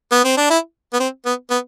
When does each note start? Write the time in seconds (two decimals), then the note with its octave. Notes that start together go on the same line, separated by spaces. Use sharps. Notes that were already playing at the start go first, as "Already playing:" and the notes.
0.11 B3
0.24 C4
0.37 D4
0.50 E4
0.93 B3
1.00 C4
1.25 B3
1.50 B3